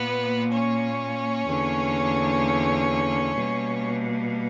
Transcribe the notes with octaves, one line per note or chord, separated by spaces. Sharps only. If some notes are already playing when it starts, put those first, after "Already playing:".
Already playing: A#2 A#3 B3 B4
C#4 C#5
E2 D3 A#3
B2 G3 A#3